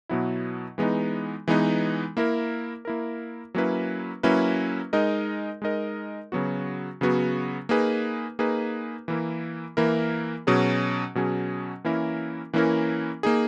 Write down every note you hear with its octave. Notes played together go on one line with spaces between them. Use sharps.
B2 F#3 B3 E4
E3 G#3 B3 D#4
E3 G#3 B3 D#4
A#3 E4 A#4
A#3 E4 A#4
F#3 A#3 C#4 E4 B4
F#3 A#3 C#4 E4 B4
G#3 D#4 A#4 D#5
G#3 D#4 A#4 D#5
C#3 F#3 B3 F#4
C#3 F#3 B3 F#4
A#3 D#4 G#4 B4
A#3 D#4 G#4 B4
E3 A#3 E4 A#4
E3 A#3 E4 A#4
B2 F#3 C#4 G#4
B2 F#3 C#4 G#4
E3 A#3 C#4 E4 A#4
E3 A#3 C#4 E4 A#4
A#3 D#4 G#4